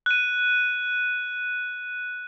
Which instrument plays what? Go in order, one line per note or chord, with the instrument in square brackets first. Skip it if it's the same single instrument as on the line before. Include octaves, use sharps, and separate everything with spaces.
[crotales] F#6 D#7